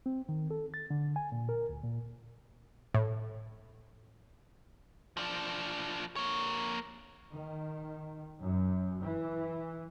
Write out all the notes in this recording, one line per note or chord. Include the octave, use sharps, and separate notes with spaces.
C4
D#3
A4
A6
D3
G#5
A#2
A#4
D2
A#2
A2
F3 D4
A#3 C#5
D#3
F#2
E3